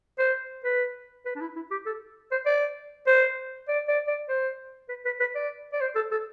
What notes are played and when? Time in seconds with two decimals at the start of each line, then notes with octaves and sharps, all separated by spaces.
0.18 C5
0.64 B4
1.26 B4
1.36 D4
1.41 E4
1.56 E4
1.71 G4
1.86 A4
2.31 C5
2.46 D5
3.07 C5
3.68 D5
3.88 D5
4.07 D5
4.29 C5
4.89 B4
5.05 B4
5.20 B4
5.35 D5
5.73 D5
5.81 C5
5.95 A4
6.11 A4